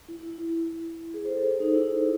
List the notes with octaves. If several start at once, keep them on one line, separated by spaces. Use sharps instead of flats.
E4
E4
E4
E4
G#4
C5
A4
A4
D#4
E4